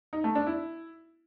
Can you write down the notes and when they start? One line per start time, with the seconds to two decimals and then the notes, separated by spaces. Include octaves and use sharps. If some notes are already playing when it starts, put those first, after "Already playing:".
0.13 D#4
0.24 A3
0.35 D4
0.47 E4